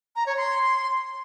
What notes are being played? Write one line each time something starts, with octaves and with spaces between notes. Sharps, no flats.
A#5
C#5
C6